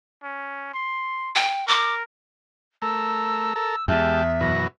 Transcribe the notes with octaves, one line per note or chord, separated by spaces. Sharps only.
C#4
C6
G5
A#4 D6
A3 A#4 E6
A4 A#4
E2 G#3 G4 E5 A5
F#2 B2 E3 A#6